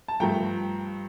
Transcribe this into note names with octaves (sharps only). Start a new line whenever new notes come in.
A5
G2 F3 A3 G5 A#5